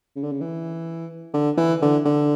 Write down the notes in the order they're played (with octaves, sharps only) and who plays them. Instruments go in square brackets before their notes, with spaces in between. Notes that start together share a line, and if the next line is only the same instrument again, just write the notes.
[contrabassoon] C#3
D3
C#3
E3
D3
E3
D3
D3